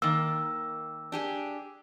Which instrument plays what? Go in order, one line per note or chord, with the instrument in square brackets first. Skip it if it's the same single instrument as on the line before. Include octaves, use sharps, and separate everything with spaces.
[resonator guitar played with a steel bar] D#3 A#3 [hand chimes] E6
[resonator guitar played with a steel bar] D4 G4 G#4